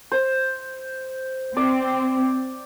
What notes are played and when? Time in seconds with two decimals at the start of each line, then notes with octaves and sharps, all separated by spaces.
0.12 C5
1.57 C4 D5